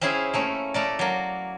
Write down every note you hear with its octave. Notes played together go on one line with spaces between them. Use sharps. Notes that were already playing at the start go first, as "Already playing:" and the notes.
C4 C#4 E4 G#4 F5
A3 A#3 C#4
A3 A#4 D5
F#3 A#3